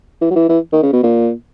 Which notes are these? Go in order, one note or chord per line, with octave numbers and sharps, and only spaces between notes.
E3
F#3
E3
E3
D#3
C#3
B2
A#2